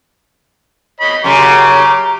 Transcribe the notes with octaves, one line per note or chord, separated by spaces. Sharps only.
C#5 D#5 B5
F#2 C#3 G4 A#5 D6